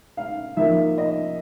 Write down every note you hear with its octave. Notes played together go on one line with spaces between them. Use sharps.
F5
F3 A#3 D#4 E5
D#5